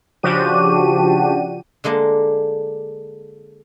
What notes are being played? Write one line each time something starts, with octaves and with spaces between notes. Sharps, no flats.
C#3 F3 D4 F#4 G4 D#7
D3 G#3 A#3 D4